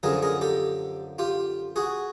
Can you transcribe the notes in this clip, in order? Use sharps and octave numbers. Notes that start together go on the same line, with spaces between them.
F#2 D3 F3 G#4 A#4
G#4 A#4
G4 A4
F4 G4
F#4 G#4